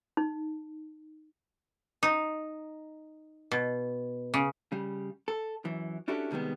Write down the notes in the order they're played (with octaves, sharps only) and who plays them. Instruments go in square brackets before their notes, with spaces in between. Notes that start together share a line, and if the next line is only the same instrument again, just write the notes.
[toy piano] D#4
[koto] D#4
B2
C#3
[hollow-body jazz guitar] C#3 G3
A4
F#2 E3
C#4 D4 E4 F#4 G4 A4
C3 D#3 G3 G#3 B3